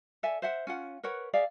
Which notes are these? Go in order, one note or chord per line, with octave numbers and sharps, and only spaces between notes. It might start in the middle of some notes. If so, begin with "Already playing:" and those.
A4 D5 E5 G#5
C5 E5 F#5
C#4 F4 F#5
A#4 B4 C#5 F#5
G#4 D5 E5 F5